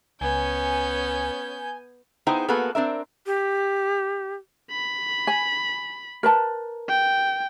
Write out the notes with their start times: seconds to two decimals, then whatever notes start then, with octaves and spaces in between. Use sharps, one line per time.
0.21 C#2 B3 C#4 G#5 G6
2.27 B3 D#4 E4 G#4 C5 G5
2.49 A#3 B3 F#4 G#4 A4 B4
2.75 C4 D4 A#4 E5
3.26 G4
4.71 B5
5.27 G#5
6.23 A#4 B4 A5
6.89 G5